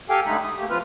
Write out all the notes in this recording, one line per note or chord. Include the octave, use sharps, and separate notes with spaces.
G4 A4 F5 G5 G#5
D3 G#3 A3 D#4 B5
D#6
A3 A#3 G4
A2 F3 C4 F4 B4 F6